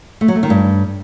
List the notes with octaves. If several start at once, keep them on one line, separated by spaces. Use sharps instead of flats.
A3
F#3
A3
D#3
G2